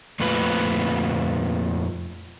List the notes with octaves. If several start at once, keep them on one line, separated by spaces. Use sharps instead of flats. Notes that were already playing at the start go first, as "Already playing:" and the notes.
F2 A#2 A3 F4 B4